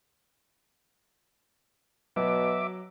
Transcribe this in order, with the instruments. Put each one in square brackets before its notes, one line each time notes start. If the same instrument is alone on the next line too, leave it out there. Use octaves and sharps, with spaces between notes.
[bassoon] B2 [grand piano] F#3 [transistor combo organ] E5 D6